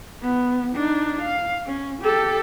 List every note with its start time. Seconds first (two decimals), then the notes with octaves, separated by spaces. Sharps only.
0.22 B3
0.75 D4 D#4
1.21 F5
1.66 C#4
2.02 G4 A4